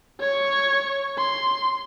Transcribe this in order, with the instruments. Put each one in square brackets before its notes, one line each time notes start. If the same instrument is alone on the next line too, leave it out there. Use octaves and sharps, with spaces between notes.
[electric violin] C#5 C#6
C6